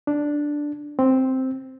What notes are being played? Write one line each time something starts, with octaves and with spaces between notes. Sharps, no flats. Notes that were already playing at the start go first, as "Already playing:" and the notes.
D4
C4